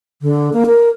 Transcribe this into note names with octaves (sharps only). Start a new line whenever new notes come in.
D3
A#3
A#4